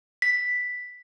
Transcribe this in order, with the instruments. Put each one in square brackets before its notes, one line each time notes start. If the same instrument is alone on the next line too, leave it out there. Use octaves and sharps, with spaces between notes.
[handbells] B6